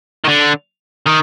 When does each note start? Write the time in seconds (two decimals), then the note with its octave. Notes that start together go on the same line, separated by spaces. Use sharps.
0.25 D#3
0.29 D3
1.07 D#3